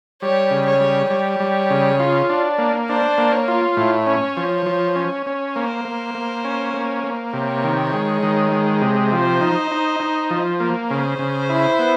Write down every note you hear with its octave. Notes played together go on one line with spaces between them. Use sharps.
G3 C#5
C#3
C#5
G3
G3 C#5
G3
C#3
F4
D4
A#3
D4 C5
A#3
C#5
F4
A2 C#5
C#4
F3
F3
C#4
C#4
A#3 C5
A#3
A#3
C#4
A#3
A#3
C3 C#5
D#3
G#3
D#3
G#3
C3
F3 C5
D#4
D#4
D#4
F3
A#3
C#3 C5
C#3
E4
B3